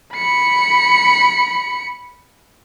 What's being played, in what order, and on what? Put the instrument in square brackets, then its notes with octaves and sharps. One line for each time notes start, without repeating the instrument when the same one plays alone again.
[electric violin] B5 C#7